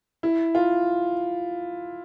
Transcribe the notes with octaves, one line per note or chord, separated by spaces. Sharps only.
E4
F4